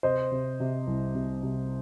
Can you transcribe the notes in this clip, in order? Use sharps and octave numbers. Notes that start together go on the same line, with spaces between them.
C3 C5 D#5
C3
C3
C2
C3
C3